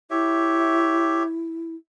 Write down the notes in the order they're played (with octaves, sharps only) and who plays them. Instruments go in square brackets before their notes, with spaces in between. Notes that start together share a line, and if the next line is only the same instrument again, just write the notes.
[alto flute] E4 [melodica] G4 C#5 E5